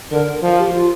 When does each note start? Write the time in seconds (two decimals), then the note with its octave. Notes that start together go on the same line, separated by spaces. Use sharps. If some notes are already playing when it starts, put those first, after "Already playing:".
0.12 D3 A#4
0.43 F3
0.58 G4
0.73 F4